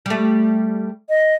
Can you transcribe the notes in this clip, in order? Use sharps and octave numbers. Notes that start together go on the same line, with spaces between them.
G3 A3
D#5